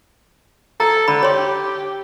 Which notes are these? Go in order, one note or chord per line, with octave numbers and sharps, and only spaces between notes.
A4 A#5
D3 B5
G4 C#5 C6